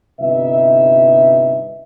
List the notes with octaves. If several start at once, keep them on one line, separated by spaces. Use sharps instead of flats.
G1 C3 D#4 B4 E5